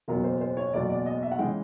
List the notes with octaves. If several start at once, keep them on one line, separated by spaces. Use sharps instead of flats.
F#1 E2 B2 F#3 A#4
C5
C5
C#5
F#1 E2 B2 F#3 D5
D5
D#5
E5
F#5
C#3 E3 G#3 G5